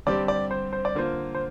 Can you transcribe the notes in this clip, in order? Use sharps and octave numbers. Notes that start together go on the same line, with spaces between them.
G2 D3 G3 C4 G4 D5
D5
C5
C5
D5
D3 A#3 F4 C5
C5